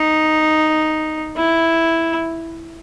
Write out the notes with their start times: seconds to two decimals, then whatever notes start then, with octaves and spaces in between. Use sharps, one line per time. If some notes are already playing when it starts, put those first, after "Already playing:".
Already playing: D#4
1.37 E4